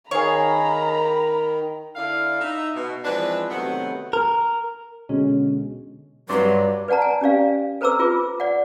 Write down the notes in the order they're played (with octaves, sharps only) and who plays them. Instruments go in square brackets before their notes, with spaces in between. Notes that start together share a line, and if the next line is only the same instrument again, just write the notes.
[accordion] D#3 [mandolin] G#4 F5 [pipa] C#5 [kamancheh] A#5 B5
[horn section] D3 E4 D5 F5
D#4 E5
B2
E3 F3 G#3 C4 D4 B4
C3 D#3 F#3 A3 B3
[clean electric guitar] A#4
[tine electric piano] B2 D3 G#3 [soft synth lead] C#4
[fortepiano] G2 C6 [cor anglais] F#3 [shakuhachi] B4 [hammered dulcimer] D5
[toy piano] B4 D5 F#5 A5 A#5
G#5
C#4 G4 D5 F5
A4 B4 C5 A#5 D6 E6
F4 G#4 B4 D6
D5 F#5